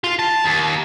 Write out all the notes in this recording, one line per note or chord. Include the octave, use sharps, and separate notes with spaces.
F4
A5
D#2